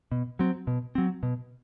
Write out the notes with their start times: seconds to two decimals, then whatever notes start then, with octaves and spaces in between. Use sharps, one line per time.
0.12 B2
0.39 F#3 C4
0.67 B2
0.95 F#3 C4
1.23 B2